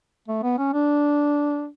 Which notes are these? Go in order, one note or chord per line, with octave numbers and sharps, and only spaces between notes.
A3
B3
C#4
D4